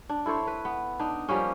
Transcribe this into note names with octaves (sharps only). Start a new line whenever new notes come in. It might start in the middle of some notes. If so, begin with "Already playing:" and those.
D4
E4 A4 C5 C#5
B4
B3
D4 D#4
F3 G3 A#3 C#4